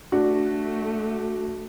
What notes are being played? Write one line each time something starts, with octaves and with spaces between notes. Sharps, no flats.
A3 D4 F#4